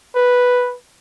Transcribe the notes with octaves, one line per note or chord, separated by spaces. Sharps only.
B4